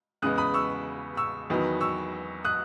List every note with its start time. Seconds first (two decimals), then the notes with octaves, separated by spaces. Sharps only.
0.22 E2 C#3 G#3 B3 D#6 F#6
0.38 B5 D#6
0.54 C#6 E6
1.17 C#6 E6
1.50 E2 D#3 F#3 B3
1.81 C#6 E6
2.45 D#6 F#6